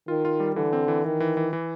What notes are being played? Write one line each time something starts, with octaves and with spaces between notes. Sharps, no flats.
D#3 F4
F4
G3
D3 E3
C4
E3
D#3 E3
E3
E3
E3